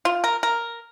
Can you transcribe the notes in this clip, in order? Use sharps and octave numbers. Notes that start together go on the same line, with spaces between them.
F4
A#4
A#4